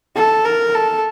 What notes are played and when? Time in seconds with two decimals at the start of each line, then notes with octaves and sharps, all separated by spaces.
0.16 A4
0.45 A#4
0.75 A4